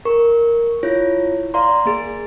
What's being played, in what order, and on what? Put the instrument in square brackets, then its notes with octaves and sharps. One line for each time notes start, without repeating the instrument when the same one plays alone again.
[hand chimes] A#4 C#6
E4 F4 C#5
D5 F5 A#5 C6
A#3 G#4